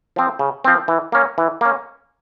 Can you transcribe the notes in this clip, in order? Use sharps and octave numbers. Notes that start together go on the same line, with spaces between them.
F3 C4
C#3
F3 C4
E3
A#3 C#4
E3
A#3 C#4